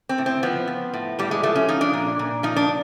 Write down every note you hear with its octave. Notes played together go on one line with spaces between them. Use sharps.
C4
A2
C4
F3 B3
F3
A2
A2 G3
G#3
F3 A3
C#4
F3 D#4
D4
A#2
A#2
F3 D#4
D4